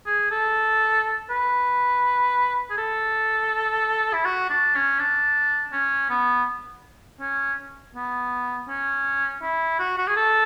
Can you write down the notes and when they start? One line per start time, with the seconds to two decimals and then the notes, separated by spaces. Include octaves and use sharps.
0.06 G#4
0.31 A4
1.30 B4
2.70 G#4
2.77 A4
4.13 E4
4.25 F#4
4.49 D4
4.75 C#4
4.99 D4
5.72 C#4
6.10 B3
7.20 C#4
7.95 B3
8.68 C#4
9.42 E4
9.79 F#4
9.98 F#4
10.07 G#4
10.16 A4